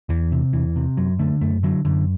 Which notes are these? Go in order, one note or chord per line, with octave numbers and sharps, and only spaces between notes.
E2 E3
C3
E2 E3
C3
F#2 F#3
D3 A3
F#2 A3
D3 F#3
F#2 D3